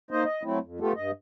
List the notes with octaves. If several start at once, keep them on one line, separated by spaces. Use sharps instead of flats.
A#3 D#4 C5 D#5
D#5
F#3 A3 C4 E4
F2
A3 B3 F4 G4 A4
G2 D#5